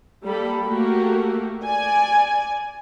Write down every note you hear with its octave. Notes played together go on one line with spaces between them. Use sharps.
G3 A#3 G4 A4 B5
A3 A#3 F#4 G4 A4
D5 G#5